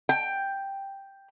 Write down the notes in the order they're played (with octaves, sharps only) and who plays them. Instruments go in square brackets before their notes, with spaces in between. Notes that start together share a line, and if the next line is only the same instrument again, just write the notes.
[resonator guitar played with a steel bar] G5